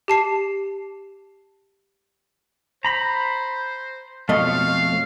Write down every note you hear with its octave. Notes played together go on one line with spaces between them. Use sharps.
G4 A5 C7
C5 A#5 B5
F2 B2 A3 C4 C#5 D#5 F5